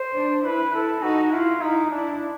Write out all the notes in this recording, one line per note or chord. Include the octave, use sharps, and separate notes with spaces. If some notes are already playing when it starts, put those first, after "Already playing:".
Already playing: C5
D4
E4 B4
A4
D#4 F#4
E4 F4
D#4 E4
D4 E4